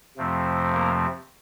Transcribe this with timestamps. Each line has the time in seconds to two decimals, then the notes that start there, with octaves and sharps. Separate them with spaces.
0.17 F2 C3 F3 A3 C4
0.73 A#3 A#4